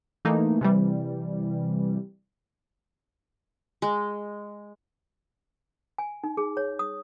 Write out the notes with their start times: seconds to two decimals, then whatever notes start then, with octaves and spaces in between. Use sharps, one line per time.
0.25 E3 A3 A#3 D#4
0.61 C3 E3 G3
3.82 G#3
5.98 G#5
6.24 D#4
6.37 G#4
6.57 C#5
6.79 D#6